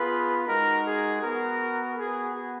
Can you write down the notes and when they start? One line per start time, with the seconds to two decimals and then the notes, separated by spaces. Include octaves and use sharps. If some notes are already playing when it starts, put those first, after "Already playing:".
Already playing: B3 F4 G#4 B4
0.47 G#3 D#4 F#4 A#4
0.84 G#4
1.22 B3 F#4 A#4
1.97 B3 F#4 G#4